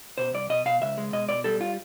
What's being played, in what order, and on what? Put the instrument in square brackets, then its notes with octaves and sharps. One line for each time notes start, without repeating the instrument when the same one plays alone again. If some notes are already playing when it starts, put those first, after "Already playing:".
[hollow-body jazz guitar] B2 C5
C2 D5
B2 D#5
B2 F5
C#2 E5
G#3
B2 D#5
B2 D5
G3 A4
F4